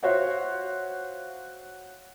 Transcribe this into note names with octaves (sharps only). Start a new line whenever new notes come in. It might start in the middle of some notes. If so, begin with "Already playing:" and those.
F4 F#4 C5 C#5 E5 F#5